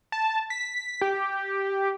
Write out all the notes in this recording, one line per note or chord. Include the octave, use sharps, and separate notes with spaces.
A5
B6
G4